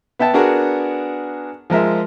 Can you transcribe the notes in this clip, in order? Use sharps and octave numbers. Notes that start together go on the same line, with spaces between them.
B3 E5 G5 A5
B3 D4 F#4 G#4 A#4
F3 G#3 A#4 E5